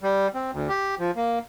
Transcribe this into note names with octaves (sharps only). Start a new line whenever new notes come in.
G3
C4
D2
G4
F3
A#3